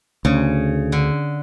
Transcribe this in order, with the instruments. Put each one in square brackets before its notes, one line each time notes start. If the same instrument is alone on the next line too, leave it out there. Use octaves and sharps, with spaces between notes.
[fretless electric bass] D2 [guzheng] C#3
[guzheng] D3